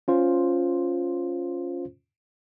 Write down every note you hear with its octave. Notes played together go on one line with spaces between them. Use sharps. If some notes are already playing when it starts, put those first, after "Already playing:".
C#4 F4 C5